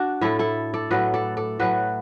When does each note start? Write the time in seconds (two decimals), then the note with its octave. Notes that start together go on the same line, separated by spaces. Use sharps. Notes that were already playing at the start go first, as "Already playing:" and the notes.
Already playing: D4 F#4
0.21 A2 A3 E4 A4
0.39 E4 A4
0.74 A4 D5
0.91 A2 F#3 A3 F#4 B4
1.14 A4 D5
1.37 A4 D5
1.59 A2 F#3 A3 F#4 B4